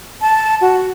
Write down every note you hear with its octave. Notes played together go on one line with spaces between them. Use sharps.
A5
F#4